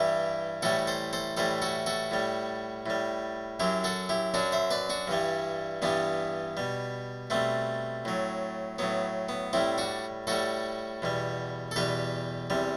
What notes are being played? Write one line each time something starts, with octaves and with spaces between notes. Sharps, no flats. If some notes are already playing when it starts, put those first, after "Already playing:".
Already playing: G2 E3 G3 E4 G4
A2 E3 G3 F#4 A4
A4 C5
A4 C5
A2 E3 G3 A4 C5
F#4 A4
F#4 A4
A2 G3
A2 G3
F#2 F#3 E4 G4
F#4 A4
E4 G4
F#2 F#3 D4 F#4
C5 E5
B4 D5
D4 F#4
G2 E3 G3
G2 E3 G3 B3 D4
B2 G3
B2 G3 A3 C4
A2 F#3
A2 F#3 B3
B3
A2 G3 C4 E4
D4 F#4
A2 G3 F#4 A4
E2 B2 G3
A4
E2 B2 G3 G4 B4
E2 C3 G3